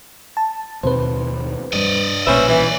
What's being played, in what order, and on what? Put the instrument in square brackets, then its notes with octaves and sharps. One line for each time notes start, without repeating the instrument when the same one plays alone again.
[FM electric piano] A5
[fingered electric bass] D#2 B2 C4 [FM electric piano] B4 C5
[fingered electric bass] G2 G3 [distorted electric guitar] D5 D#5
[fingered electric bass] B1 A#2 [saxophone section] C#4 C5 E5 [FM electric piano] B4
[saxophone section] E3